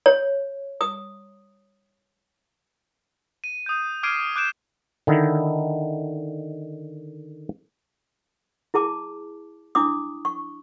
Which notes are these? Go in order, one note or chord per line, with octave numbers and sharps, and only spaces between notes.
C#5
D#6
D#7
D#6 G6
D6 F6 G#6 C7 D7 D#7
D6 F#6 G6 D7 E7
D3 D#3 D#4 E4
E4 G#4 A5 D6
D4 E4 D6 D#6
C#6